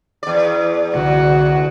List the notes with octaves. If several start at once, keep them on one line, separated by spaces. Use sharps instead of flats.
E2 D5
C2 D3 F#4